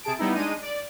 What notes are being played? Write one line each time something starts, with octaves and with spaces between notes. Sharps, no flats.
C3 G#4 A5 D7
G3 B3 D#4 E4
G#3 D4 D#4 D#7
D5